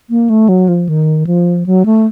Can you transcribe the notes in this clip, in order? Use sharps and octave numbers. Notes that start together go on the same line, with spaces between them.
A#3
A3
F#3
F3
D#3
F3
F#3
A3